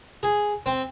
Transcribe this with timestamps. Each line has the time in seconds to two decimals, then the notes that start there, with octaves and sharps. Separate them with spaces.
0.23 G#4
0.66 C4